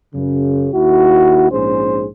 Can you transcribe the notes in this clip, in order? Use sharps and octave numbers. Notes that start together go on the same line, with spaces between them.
F#2 C#3
D#2 E4 F#4
A#1 G#2 C#4 G#4 C5